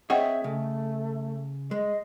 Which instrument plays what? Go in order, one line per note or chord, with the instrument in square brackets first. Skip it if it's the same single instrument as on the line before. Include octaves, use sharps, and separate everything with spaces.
[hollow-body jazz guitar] C4 G#4 C#5 [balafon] D#5 F#5 G5 [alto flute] E5
[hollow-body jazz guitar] C#3 [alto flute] A3
[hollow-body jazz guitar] G#3 [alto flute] D#5